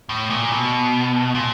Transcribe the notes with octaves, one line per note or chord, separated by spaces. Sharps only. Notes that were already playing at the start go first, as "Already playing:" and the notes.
A2
A#2
B2
A#2